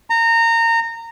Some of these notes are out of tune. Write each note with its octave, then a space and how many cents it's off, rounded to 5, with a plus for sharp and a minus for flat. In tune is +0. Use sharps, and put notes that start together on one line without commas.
A#5 -25